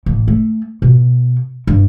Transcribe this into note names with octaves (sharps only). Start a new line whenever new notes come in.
A1
A3
B2
G2